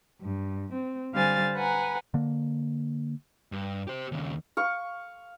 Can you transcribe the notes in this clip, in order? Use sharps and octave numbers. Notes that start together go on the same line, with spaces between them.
G2
C4
D3 G3 C5 F5 G#5 A6
B4 F#5 G#5 A#5
D3 A#3
G2
G4 C5
D#2 C#3
F5 C#6